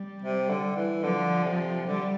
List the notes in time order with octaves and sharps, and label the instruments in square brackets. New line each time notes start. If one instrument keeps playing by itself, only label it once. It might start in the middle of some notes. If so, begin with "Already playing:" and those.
Already playing: [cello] G3
[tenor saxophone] C3
D3
E3
[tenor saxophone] D3 [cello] F3
[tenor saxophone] C3
[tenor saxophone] D3 [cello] G3